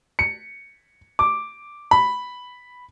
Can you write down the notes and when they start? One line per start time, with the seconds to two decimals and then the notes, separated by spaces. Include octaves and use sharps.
0.19 C#7
1.19 D6
1.91 B5